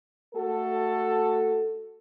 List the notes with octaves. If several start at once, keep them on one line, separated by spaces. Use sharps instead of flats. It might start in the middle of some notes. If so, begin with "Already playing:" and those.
A3 F#4 A4